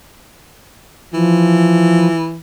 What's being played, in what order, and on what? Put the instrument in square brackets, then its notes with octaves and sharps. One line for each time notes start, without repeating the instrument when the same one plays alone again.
[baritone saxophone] E3 [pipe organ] F3